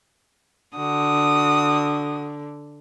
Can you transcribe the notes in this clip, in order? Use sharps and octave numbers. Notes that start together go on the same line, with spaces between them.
D3 F#4 D#6